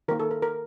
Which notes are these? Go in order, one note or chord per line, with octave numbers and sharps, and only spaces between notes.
D#3 A#3 A#4
A4
A#4
A#4